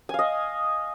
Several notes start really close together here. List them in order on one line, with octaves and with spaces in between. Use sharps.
G#5 F5 D#5